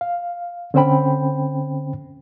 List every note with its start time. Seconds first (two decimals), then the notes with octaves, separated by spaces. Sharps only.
0.01 F5
0.74 D3 C4 C#4 C5 G5 B5